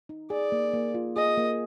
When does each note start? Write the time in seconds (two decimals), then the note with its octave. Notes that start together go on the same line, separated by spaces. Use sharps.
0.09 D#4
0.30 G#4 D5
0.52 A#3
0.74 A#3
0.94 F4
1.16 G#4 D#5
1.37 A#3